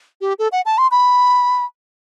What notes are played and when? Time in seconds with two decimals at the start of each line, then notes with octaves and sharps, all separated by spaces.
0.21 G4
0.39 A4
0.52 F#5
0.66 A5
0.78 C6
0.91 B5